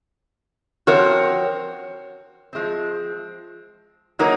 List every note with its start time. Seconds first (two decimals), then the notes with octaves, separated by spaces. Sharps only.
0.87 F3 C4 F#4 A#4 C#5
2.53 F3 G#3 C4
4.19 F#3 A#3 D#4 A#4